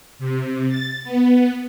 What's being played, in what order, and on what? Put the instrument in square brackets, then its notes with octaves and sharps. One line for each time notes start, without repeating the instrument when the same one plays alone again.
[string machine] C3
A6
B3